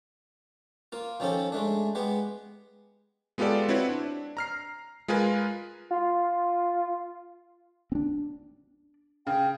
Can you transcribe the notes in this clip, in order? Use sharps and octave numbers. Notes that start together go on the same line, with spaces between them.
A#3 F4
D#3 F3 C#4 G4 A4
G#3 A3 D4
G#3 B3 G4
G#3 B3 F4 G4 A4 D5
C4 E4 F#4 B4 C#5
D4
A#5 F6 C7
G#3 F4 G#4 A#4 B4 G#5
F4
C4 D4
C#3 G5